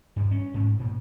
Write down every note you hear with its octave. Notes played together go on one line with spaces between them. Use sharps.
G2
C#4
G#2
A#2